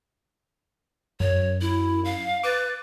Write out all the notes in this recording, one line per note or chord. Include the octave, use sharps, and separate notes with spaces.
F#2 C#5
E4
F5
B4 D6 A6